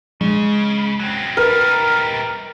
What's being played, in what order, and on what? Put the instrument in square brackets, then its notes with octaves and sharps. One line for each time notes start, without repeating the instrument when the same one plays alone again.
[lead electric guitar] C#3 [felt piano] G#3
[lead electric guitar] F#3 C4
[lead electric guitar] G3 D#4 [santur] A#4 [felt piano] B4